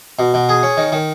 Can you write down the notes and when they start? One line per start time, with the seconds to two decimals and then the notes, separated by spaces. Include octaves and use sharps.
0.19 B2
0.34 B2
0.49 G#4
0.63 C#4
0.77 D#3
0.92 D#3